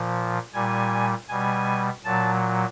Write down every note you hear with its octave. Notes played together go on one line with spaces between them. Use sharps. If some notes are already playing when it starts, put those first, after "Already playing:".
Already playing: A#2 F3
A#2 G3 G#5
B2 G3 G#5
A#2 F#3 A5